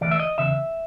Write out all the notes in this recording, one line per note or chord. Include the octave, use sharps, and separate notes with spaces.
D2 C3 E3 D5
E5
D#5
E2 C#3 E5